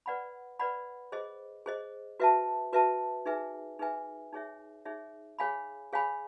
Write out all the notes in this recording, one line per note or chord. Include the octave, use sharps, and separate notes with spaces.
B4 D5 F#5 B5
B4 D5 F#5 B5
G#4 C5 D#5
G#4 C5 D#5
F#4 B4 E5 A5
F#4 B4 E5 A5
D#4 G#4 B4 E5 G#5
D#4 G#4 B4 E5 G#5
D#4 G#4 C#5 E5
D#4 G#4 C#5 E5
G#4 C#5 F5 G#5 B5
G#4 C#5 F5 G#5 B5